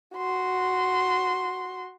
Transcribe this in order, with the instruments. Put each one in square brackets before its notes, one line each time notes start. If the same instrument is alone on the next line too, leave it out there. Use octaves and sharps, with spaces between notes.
[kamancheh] F#4 C6